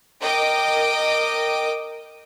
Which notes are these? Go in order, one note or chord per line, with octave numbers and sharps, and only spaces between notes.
A#4 D#5 G5 D6